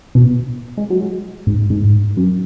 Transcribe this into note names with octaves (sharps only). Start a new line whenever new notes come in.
B2
G#3
F#3
G#3
G#2
G#2
F#2